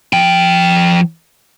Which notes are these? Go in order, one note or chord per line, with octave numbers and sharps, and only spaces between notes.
F3 G5